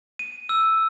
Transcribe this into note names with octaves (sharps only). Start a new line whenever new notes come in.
D#7
E6